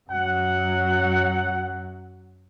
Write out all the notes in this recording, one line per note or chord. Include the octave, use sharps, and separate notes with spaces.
F#2 F#3 F#5